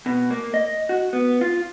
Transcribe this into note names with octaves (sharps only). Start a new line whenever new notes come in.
B2
A#3
D#5
F#4
B3
F4